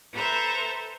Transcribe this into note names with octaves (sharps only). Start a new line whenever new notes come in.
A4 B4 C5 E5 A#5